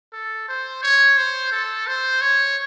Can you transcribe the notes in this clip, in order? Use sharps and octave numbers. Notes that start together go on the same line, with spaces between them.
A4
C5
C#5
C5
A4
C5
C#5